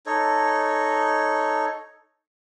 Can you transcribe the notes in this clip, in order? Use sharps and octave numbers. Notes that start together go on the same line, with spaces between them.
D#4 A4 C#5